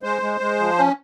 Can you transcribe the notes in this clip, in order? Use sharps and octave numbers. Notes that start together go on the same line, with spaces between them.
G#3 C5
G#3
G#3
F3
C#4